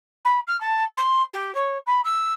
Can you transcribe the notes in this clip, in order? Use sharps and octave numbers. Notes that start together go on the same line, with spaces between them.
B5
F6
A5
C6
G4
C#5
B5
E6